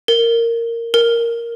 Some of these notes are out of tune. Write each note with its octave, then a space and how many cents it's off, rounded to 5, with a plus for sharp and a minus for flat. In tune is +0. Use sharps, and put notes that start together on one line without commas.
A#4 -10
A#4 +0